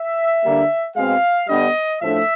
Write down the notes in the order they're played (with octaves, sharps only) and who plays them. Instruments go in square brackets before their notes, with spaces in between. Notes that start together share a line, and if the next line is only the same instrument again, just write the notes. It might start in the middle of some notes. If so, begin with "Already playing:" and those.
Already playing: [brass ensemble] E5
D3 G3 A#3 D4
B2 G#3 C4 F5
D3 G3 B3 D4 D#5
A2 F3 A3 D4 E5